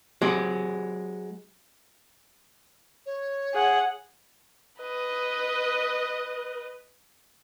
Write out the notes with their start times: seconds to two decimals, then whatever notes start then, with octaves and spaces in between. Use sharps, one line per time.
0.22 F#3 G#3 C4 G4
3.06 C#5
3.54 G#4 F#5
4.81 B4 D#5